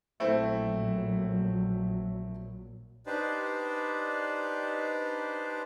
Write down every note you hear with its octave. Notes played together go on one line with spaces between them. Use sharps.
A#1 A#2 F#3 A3 C4 E4
D4 D#4 G4 B4 C5 D5